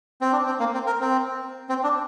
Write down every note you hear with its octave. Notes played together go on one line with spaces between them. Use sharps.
C4
D4
C4
A#3
C4
A#4
C4
C4
D4